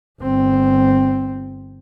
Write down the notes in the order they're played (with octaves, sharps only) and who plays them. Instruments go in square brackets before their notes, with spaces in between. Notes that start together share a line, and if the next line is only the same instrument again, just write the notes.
[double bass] G1 C4